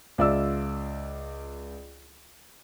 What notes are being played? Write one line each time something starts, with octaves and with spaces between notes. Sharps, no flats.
C#2 F4 D5 E5 E6